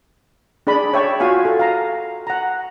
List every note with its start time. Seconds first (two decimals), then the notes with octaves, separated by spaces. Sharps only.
0.67 D4 G#4 D5 B5
0.93 C#5 D5 E5 G5 C#6
1.20 F4 F#4 F5 G#5
1.45 A4
1.59 F5 A#5
2.27 F#5 A#5